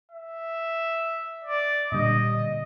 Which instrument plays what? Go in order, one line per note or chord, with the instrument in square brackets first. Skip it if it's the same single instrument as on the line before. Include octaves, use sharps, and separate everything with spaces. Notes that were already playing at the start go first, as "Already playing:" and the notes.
[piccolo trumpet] E5
D5
[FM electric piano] A#2 D3 G3 [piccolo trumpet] D#5